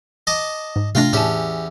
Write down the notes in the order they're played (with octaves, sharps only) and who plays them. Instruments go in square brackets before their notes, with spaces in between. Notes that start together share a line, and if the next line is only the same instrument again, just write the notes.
[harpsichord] D#5 A5 D6
[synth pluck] G#2
[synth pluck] C3 A3 D4 [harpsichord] F4 G5 A#5
[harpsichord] E2 C#4 G4 [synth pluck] A2 A5